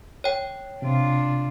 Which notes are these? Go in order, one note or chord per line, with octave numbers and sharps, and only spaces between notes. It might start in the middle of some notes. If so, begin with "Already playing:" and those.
C#5 G5
C3 D4 F4